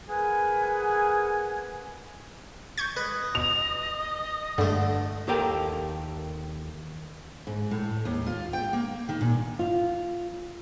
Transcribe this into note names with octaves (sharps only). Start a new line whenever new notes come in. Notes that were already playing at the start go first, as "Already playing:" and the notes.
G#4 A#4 B4 F#5 G#5
C#6 G6 G#6
B4 D#5
B2 F7
G2 D3 A3
D#2 G4 A4 A#4 G5
G#2
A2
D#2
F4
G5
A#3
D#3
A#2
F4